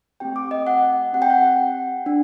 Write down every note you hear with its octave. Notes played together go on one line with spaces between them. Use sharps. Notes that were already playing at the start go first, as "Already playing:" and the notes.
A3 C4 G4 G5
D6
D#5
F#5
C4 G4 F#5
G5
F#5
D4